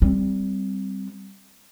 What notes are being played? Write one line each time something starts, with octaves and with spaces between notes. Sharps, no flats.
G3 C4